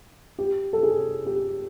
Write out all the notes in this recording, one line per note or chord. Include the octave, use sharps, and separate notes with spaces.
G4
A4
G#4
G4